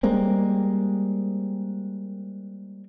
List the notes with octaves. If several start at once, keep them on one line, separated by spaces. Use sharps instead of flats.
G3 G#3 A#3 C4